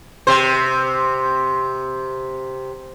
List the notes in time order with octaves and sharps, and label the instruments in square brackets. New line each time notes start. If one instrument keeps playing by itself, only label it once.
[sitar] C3 C5